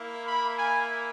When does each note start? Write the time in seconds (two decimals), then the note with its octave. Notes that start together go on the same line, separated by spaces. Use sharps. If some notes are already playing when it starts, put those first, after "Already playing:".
Already playing: A#3 E4
0.28 B5
0.59 G#5